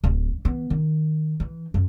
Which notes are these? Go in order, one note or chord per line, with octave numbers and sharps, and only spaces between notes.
D1
E3 B3
D#3
E3
F#2